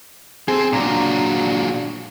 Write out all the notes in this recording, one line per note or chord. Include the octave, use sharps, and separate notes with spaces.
C4 G#4 A4 C6
A#2 F#3 D4 A#5